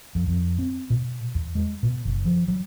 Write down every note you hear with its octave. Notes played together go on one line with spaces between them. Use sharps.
F2
F2
C4
B2
E2
G#3
B2
F#1
F3
F#3